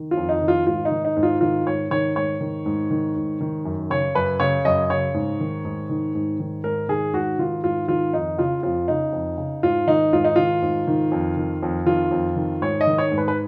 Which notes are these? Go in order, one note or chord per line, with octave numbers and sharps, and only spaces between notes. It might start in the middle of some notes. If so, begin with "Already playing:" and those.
Already playing: D#3
F4
F2
D#4
D#3
F4
G#2 F4
D#4
D#3
D#4
G#2
F4
D#3 F4
G#2 C#5
D#3 C#5
G#2 C#5
D#3
G#2
D#3
G#2
D#3
F#2
C#3 C#5
F#2 B4
C#3 C#5
F#2 D#5
C#3 C#5
G#2
D#3
G#2
D#3
G#2
D#3
G#2 A#4
D#3 G#4
G#2 F#4
D#3 F4
G#2 F4
D#3 F4
F2 D#4
C#3 F4
F2 F4
C#3 D#4
F2
C#3
G#2 F4
D#3 D#4
G#2 F4
D#4
D#3 F4
G#2
D#3
F2
D#3
F2
D#3 F4
F2
D#3
G#2 C#5
D#5
D#3
C#5
G#2
B4
B4